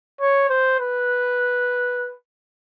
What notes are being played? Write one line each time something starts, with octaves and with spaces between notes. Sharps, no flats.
C#5
C5
B4